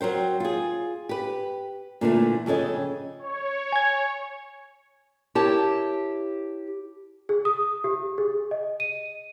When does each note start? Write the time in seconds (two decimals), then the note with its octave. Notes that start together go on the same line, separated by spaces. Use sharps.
0.01 F#3 A#4 C5 G5
0.40 F4 G#4
1.09 G4 B4
2.01 A#2 D3 E3 A3
2.46 F2 C#3 A4 C#5 D#5
3.19 C#5
3.72 G#5 G#6
5.35 E4 G4 A#4 C#5 A5
7.29 G#4
7.45 D#6
7.84 G4
8.18 G#4
8.51 D#5
8.80 D#7